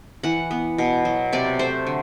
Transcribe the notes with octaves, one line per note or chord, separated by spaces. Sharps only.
E3 F#5
B3
B2
F#3
C3 D5
A3 C5
D3